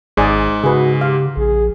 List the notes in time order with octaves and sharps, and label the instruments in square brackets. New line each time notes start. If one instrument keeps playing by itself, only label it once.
[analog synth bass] G#1 [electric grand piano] G#2 [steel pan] G#4 D5 G#5
[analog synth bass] C#3 [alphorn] F#4 [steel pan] G#4 B4
[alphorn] G4 [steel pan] F5
[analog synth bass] A#1 [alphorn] G#4